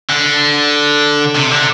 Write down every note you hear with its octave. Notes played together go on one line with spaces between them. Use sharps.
D3
C3
D3